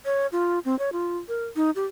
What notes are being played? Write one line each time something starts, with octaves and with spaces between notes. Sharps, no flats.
C#5
F4
C4
C#5
F4
A#4
D#4
G4